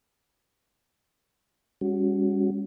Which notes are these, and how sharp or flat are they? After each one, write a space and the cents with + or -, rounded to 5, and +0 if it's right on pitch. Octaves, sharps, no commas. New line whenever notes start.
G3 +45 C#4 +10 F#4 +0